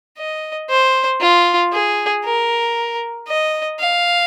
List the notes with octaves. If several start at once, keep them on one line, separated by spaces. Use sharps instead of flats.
D#5
C5
F4
G#4
A#4
D#5
F5